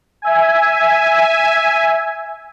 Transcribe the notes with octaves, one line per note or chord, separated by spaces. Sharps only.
E5 G#5